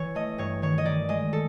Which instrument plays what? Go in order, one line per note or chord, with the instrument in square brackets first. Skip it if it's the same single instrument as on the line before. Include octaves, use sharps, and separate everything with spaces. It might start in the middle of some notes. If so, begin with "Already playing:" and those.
Already playing: [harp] E3 C#5
A3 D#5
G2 C#5
D#3 C#5
D#5
D#3 D5
G#3 D#5
A4